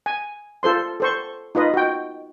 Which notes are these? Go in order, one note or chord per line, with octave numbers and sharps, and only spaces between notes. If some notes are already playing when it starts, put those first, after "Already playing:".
G#5
F4 A4 C5 C6
A4 C5 C#6
D#4 F4 B4 D#5
F#4 G5